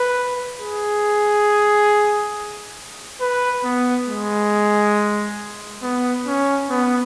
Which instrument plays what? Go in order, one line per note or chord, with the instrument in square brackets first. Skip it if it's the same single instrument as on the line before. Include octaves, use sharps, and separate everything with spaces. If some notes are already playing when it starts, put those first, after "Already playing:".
Already playing: [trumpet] B4
G#4
B4
B3
G#3
B3
C#4
B3